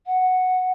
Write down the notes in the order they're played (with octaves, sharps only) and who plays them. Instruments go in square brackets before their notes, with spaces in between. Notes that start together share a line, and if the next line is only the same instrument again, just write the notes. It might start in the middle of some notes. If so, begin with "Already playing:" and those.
[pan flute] F#5